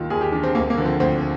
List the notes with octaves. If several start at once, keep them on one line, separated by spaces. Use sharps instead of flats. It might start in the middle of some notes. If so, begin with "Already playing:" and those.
Already playing: D#2 D#3 F4
D#2 G#4
G4
D#3 D4
C4
D2 A#3
A#3
D3 F3
C4
D2 C4
D4